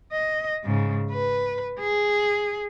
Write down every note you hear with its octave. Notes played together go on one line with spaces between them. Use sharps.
D#5
G#2 C#3
B4
G#4